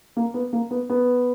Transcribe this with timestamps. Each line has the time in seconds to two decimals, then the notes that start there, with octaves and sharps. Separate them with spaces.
0.17 A#3
0.34 B3
0.53 A#3
0.71 B3
0.90 B3